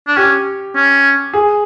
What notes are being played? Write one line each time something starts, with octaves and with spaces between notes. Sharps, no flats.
D4
C#4 G4
C#4
G#4